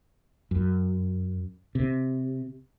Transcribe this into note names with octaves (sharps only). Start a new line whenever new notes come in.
F#2
C3